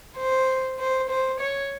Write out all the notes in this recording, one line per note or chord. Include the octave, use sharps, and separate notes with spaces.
C5
C5
C5
C#5